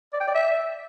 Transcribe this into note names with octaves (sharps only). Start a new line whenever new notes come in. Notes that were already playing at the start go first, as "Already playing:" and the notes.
D5
G5
D5
E5